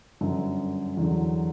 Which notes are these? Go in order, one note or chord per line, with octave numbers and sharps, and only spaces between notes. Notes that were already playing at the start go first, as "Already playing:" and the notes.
G1 F#2 D3
E2 D3 F#3